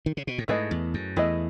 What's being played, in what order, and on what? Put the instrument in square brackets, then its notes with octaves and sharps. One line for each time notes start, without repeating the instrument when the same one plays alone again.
[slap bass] D#3
C#3
B2
A2
[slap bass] G#2 [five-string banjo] A3 E4 G#4 B4 D#5
[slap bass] E2
F#2
[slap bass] E2 [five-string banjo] A3 E4 G#4 B4 D#5